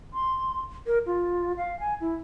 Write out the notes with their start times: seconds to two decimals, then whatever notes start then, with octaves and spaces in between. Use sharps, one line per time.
0.14 C6
0.87 A#4
1.06 F4
1.57 F5
1.80 G#5
2.01 E4